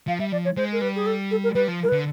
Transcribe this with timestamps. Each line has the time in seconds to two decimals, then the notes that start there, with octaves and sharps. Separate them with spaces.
0.07 F3 F5
0.20 G3 E5
0.32 F3 D5
0.45 C#5
0.57 G#3 C5
0.73 A#4
0.81 G3 B4
0.96 G#4
1.06 A4
1.31 A4
1.44 A#4
1.55 G3 B4
1.68 F3
1.83 A#4
1.89 B4
1.92 D3